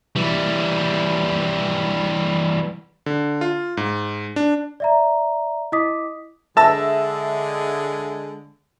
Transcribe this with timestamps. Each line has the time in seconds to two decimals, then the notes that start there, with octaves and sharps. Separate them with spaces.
0.16 E3 G3
3.06 D3
3.41 F4
3.77 G#2
4.36 D4
4.80 D5 E5 A#5
5.72 E4 D#5 D6 D#6 B6
6.57 D3 G#3 E5 A5 E6 A#6